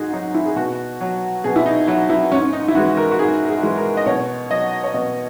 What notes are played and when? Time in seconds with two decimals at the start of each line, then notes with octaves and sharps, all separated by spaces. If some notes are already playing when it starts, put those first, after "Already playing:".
Already playing: G#2 D#4 F#4 G#4
0.13 F#3 D#4
0.35 E4
0.46 G#4
0.56 B2 F#4
1.01 F#3
1.44 B2 G#4
1.56 E4
1.66 D#4
1.87 F#3 E4
2.10 E4
2.32 G#2 C#4
2.53 D#4
2.68 E4
2.75 E3 G#3 F#4
2.97 A#4
3.11 F#4
3.19 G#2 G#4
3.48 G#4
3.63 E3 G#3
3.77 A#4
3.97 D#5
4.06 B2 C#5
4.50 F#3 D#5
4.84 C#5
4.94 B2 D#5